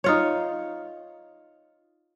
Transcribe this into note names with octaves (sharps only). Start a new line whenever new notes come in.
D#4 F4 C#5